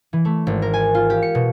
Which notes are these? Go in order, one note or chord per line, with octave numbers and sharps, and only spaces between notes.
E3
A3
G#1
A#4
G#5
F4
G4
C#7
B2